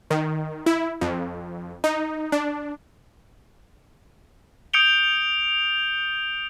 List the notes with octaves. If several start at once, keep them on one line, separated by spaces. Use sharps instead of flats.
D#3
E4
F2
D#4
D4
D#6 G6 C#7 D7 F7 G7